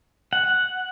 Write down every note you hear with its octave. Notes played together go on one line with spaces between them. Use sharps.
F#5